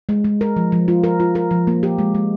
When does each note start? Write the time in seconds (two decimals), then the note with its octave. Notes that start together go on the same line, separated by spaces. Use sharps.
0.09 G#3
0.24 G#3
0.41 A#4
0.56 F3
0.72 F3
0.88 F4
1.04 A#4
1.20 F4
1.35 A#4
1.51 F3
1.67 A#3
1.83 G4
1.98 G#3
2.15 G#3